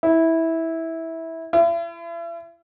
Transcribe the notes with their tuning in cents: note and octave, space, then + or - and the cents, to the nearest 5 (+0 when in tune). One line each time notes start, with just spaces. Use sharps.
E4 -15
E4 +40